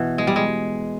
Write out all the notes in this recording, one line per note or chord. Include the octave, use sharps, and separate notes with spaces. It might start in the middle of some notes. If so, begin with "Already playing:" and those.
Already playing: B2 E3
G#3
G3
G#3